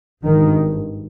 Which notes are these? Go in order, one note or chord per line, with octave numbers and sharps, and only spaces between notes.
G#1 G2 D#3